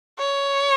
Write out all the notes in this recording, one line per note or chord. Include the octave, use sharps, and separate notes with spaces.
C#5